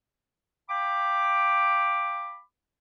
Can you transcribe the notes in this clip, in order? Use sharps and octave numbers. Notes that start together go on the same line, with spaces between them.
F5 G5 B5 D6